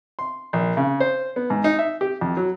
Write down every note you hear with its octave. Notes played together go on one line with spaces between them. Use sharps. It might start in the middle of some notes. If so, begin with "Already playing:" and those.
C6
A#1
C#3
C5
B3
G#2
D#4
E5
G4
F2
F#3